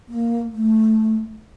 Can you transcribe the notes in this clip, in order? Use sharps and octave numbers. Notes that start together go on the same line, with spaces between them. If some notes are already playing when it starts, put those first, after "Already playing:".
A#3
A3